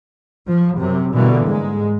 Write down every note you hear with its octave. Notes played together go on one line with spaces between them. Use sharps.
F3
F#2 C3
B2 D3 E3 G3 A#3 B3
G#2 G#3